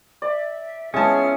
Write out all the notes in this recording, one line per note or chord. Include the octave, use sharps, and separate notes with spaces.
D5 E5
G#3 B3 C#4 E4 F4 G#4 A5 F6